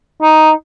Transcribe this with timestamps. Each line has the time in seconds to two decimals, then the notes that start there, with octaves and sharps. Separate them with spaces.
0.22 D#4